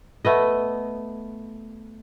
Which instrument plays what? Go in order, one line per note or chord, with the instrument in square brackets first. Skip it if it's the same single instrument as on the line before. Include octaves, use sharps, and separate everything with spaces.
[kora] A3 B3 D#5